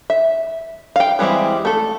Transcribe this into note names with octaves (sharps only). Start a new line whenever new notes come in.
E5
F5 G5
E3 G3 G#3 C4 E4
A3 A4